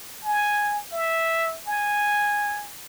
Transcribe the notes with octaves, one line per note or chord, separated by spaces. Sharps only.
G#5
E5
G#5